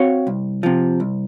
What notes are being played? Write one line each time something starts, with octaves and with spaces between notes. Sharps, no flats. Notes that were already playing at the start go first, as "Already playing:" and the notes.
Already playing: C4 F#4 C#5 F5
C2
C3 F3
C2